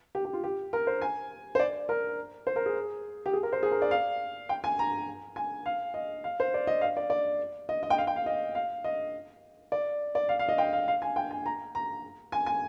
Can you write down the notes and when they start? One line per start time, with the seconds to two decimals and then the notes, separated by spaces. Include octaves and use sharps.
0.15 G4
0.25 G4
0.33 F4
0.44 G4
0.73 A#4
0.87 C5
1.02 G#5
1.55 C5
1.60 D5
1.89 A#4
2.47 C5
2.56 A#4
2.66 G#4
3.26 G4
3.33 G#4
3.43 A#4
3.52 C5
3.63 G#4
3.72 A#4
3.82 D5
3.91 F5
4.49 G5
4.64 G#5
4.79 A#5
5.36 G#5
5.66 F5
5.94 D#5
6.24 F5
6.40 C5
6.54 D5
6.67 D#5
6.81 F5
6.97 D5
7.10 D5
7.69 D#5
7.83 D#5
7.90 G5
7.98 F5
8.07 G5
8.16 F5
8.26 D#5
8.55 F5
8.84 D#5
9.72 D5
10.15 D5
10.29 F5
10.39 F5
10.49 D#5
10.58 G5
10.73 F5
10.88 F5
11.02 G#5
11.16 G5
11.31 G#5
11.46 A#5
11.75 A#5
12.32 G#5
12.46 G#5